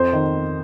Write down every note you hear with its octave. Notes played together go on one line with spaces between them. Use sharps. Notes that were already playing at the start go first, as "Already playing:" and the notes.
Already playing: F2 C5
D#3